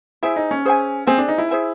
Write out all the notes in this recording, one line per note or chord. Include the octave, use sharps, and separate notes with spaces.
E4 G#4 C5 E5 G#5
D#4
C#4
G#4 C5 E5 G#5
C4 G#4 C5 E5 G#5
D4
D#4
E4
G#4 C5 E5 G#5